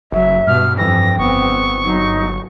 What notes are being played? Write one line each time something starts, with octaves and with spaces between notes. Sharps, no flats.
F#1 F#3 E5
G2 B2 F6
F2 E3 G5 A#6
G1 B3 C4 C#6
F#3 D#4